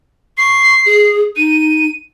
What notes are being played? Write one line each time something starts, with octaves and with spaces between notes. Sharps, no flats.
C#6 C7
G#4
D#4 D#7